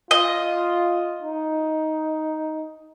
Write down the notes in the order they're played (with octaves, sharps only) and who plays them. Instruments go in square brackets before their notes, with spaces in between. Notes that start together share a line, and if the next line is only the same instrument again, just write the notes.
[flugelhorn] F4 [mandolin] D#5
[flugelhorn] D#4